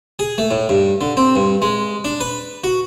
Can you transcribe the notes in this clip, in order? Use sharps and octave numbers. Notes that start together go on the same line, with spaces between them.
G#4
A3
A2
G2
D3
C4
G2
G#3
D4
B4
F#4